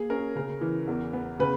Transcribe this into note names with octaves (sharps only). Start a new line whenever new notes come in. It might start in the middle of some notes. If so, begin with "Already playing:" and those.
Already playing: A#3 G#4
C#4 A#4
C#3 A#4
E3
E2
B3
C#3 B4